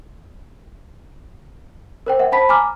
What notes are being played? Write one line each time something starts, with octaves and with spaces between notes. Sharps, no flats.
A#4 C5 G5
E5 F#5
C5 A5 B5 B6
G#5 A#5 D6 F6